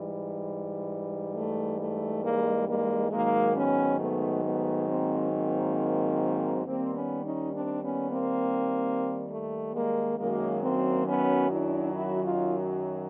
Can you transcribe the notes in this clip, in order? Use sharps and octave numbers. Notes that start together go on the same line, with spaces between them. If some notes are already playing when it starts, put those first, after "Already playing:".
Already playing: G#2 E3 G3
A3
A3
G#3 A#3
G#3 A#3
G#2 D#3 F#3 G#3 A#3
B3 C#4
A3 B3
A3 B3
A#3 C4
A#3 C4
D#2 D#3 G3 A#3 C4
B3 C#4
C#4 D#4
C4 D4
B3 C#4
A#3 C4
A3
G#3 A#3
F#2 D#3 F#3 G#3 A#3
A#3 C4
B3 C#4
D4 E4
E4 F#4
D#4 F4